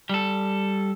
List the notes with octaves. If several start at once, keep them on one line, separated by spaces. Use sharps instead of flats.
G3 A4